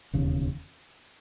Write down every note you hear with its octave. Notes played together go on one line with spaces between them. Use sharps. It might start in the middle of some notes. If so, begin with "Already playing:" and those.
E1 D#2 C#3